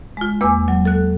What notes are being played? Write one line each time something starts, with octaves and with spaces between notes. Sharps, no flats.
G#3 F4
E2 A#3 B4 G#5 D6 E6
F#3
A4 F#6